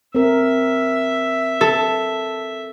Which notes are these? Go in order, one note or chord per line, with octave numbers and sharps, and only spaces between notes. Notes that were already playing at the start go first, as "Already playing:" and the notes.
C4 A#4 E5
A4